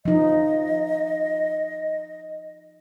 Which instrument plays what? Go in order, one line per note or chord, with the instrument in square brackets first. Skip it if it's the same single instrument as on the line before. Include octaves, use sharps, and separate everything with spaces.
[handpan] F3 D#4 [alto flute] D#5